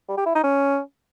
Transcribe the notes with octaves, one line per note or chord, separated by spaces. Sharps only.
G3
G4
E4
D#4
C#4